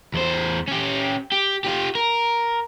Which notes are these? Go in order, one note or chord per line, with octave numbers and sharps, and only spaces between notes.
E2 C5
C#4 G4
G4
F4 G4
A#4